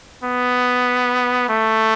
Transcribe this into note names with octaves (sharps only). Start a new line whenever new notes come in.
B3
A3